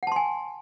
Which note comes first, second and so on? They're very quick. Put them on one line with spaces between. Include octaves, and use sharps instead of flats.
F#5 A5 C6 G#5